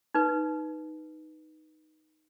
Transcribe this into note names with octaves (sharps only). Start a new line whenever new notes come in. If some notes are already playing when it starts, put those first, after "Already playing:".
D#4 B4